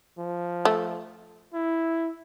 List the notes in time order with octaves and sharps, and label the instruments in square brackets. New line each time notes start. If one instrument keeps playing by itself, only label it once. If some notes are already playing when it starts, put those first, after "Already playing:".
[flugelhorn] F3
[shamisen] A3
[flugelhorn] E4